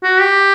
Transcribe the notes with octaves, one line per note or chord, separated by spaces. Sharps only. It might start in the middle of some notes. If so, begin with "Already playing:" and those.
F#4
G4